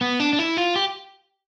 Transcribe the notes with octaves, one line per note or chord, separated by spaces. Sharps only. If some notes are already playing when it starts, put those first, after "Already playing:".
B3
D4
D4
E4
F4
G4